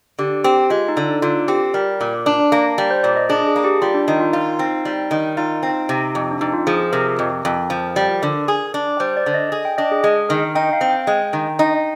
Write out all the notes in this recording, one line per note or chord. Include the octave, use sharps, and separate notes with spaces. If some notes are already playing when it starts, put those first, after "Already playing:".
D3 G4
C4 G4
G#3 F4
D#4
D3
D#4
D3 F4
C4 G4
G3 A#4
A#2
D4
A#3
G3
C5
A#2 D5
D#5
D4 G#4
G#4
A#3
G4
G3 F4
D4
D#3 D#4
F4
D#4 F4
C4 D#4
G3
D#3
D#4 F4
C4
C3
F2
D4
F2 D#4
F4
F3 G#4
G#4
C3 A#4
F2
F2
F3
G3
D3
G#4
D4
G3 C5
D5
D3
D#5
G#4
G5
D4 D#5
G#4
G#3 G#4
D#3 A#4
D#4 G5
F5
C4
G5
G#3 G5
D#3
D#4